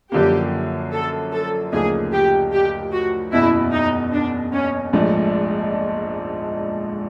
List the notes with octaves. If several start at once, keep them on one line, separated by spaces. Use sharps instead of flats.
F#2 D3 F3 A#3 G4
A4
A4
D2 C#3 F3 A#3 D#4 G#4
G4
G4
F#4
F#1 E2 B2 E4
D#4
D4
C#4
A#1 G#2 F3 A3 D4